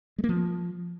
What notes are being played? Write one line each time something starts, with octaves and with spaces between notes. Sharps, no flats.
G#3
A#3
F3